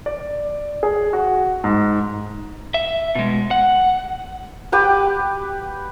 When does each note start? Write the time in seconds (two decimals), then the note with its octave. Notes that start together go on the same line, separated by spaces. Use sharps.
0.06 D5
0.83 G#4
1.13 F#4
1.64 G#2
2.74 E5
3.15 B2 G#3
3.51 F#5
4.72 G4 B4 G5